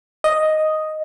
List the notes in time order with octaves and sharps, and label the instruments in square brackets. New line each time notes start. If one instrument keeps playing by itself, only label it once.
[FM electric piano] D#5